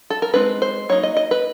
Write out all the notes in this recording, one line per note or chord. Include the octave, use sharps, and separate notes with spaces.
A4
A#4
G#3 C4 D#4 B4
C5
F#3 A#3 D#4 C#5
D#5
D#5
B4